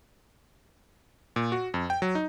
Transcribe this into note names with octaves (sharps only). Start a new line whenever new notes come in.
A#2
F#4
F2
G5
F#3
D#4